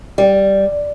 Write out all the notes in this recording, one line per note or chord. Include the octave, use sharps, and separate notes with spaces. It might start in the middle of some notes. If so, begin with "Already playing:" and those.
G3